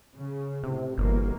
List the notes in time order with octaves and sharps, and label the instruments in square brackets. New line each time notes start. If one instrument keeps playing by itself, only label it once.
[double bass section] C#3
[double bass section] A2 [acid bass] C3
[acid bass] G1 [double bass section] B2 E3 A#3